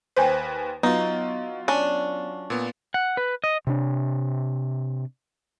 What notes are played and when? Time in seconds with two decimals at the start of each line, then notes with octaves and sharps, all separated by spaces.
0.16 D#2 B4 C5 G5 G#5
0.83 F#3 B3 D#4 F4
1.68 C#4 D4
2.50 A#2 B3
2.94 F#5
3.17 B4
3.44 D#5
3.67 C3 D4